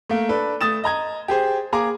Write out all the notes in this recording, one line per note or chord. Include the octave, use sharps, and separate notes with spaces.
A3 A#3
D4 A4 B4
A3 D#6 A6 E7
D#5 A#5 G#6
G4 G#4 C5
A#3 G#4 A#5 D6